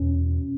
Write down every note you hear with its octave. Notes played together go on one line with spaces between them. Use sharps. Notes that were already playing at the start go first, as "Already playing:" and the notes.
Already playing: E2 B2 C#4